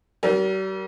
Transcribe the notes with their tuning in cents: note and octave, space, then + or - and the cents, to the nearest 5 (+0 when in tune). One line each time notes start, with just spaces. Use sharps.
G3 -40 A#4 +10